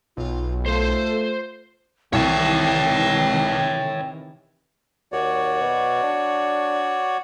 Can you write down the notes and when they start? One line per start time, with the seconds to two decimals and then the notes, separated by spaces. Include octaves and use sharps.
0.17 B1 F4
0.66 A3 F4 A4 C5 C6
2.13 C2 C3 D#3 E3 C#5 E5 G5
5.12 D#2 F#4 C#5 D5
5.61 B2
6.03 D4